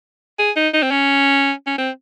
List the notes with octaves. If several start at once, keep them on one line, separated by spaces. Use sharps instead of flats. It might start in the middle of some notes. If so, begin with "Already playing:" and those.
G#4
D#4
D#4
C4
C#4
C#4
C4